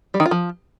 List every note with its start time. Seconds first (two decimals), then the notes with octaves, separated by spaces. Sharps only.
0.14 G3
0.20 D#3
0.26 F4
0.31 F3